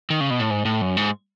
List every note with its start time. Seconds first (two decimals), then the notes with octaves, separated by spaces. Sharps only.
0.10 D#3
0.21 C#3
0.30 B2
0.40 A2
0.50 G#2
0.65 A2
0.81 F#2
0.97 G#2